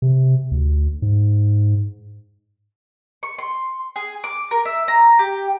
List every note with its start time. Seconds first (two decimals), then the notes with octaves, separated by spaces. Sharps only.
0.02 C3
0.51 D2
1.02 G#2
3.23 C#6
3.38 C6
3.96 G#4
4.24 D6
4.51 A#4
4.65 E5
4.88 A#5
5.19 G4